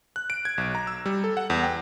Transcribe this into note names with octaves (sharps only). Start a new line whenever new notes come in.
F#6
D7
G#6
B1
A#5
E6
G3
A4
F#5
E2
G5